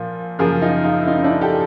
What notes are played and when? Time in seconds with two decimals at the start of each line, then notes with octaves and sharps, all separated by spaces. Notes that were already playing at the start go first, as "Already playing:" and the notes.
Already playing: A#2 F3 A#3
0.39 F#2 C#3 F3 A#3 G#4 A#4
0.62 D#4 F4
0.84 D#4 F4
1.01 E4
1.07 D#4 F4
1.19 D#4
1.24 D4 E4
1.41 G4 A4